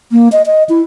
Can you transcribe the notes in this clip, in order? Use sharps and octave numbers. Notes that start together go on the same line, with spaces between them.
A#3
D#5
D#5
E4